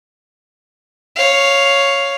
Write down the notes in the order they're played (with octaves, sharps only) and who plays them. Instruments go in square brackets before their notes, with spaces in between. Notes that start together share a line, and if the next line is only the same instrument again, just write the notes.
[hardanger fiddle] C#5 F5